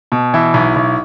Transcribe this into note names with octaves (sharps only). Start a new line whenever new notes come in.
B2
E3 E4
B1
B1